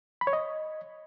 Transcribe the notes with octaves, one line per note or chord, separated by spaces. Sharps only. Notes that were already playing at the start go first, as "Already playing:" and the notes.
B5
C#5
D#5